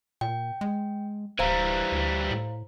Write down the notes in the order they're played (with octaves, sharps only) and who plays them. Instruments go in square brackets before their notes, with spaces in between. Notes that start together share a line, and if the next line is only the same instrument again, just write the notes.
[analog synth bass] A#2 [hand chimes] G5
[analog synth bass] G#3
[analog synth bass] D1 [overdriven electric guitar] E3 G3 [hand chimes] C5 F5 A#5
[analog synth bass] D2
A2